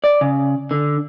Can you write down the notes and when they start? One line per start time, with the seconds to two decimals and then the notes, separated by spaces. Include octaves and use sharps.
0.04 D5
0.21 C#3
0.71 D3